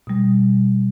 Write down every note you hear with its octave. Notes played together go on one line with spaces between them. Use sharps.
B2 G3